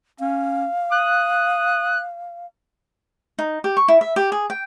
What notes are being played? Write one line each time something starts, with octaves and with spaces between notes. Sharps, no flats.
C#4 F5
D#6 F#6
D#4
G4
C#6
E4
E5
G4
G#4
G5